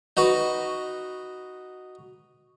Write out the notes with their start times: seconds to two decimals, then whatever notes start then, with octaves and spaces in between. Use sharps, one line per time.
0.17 D#4 F#4 B4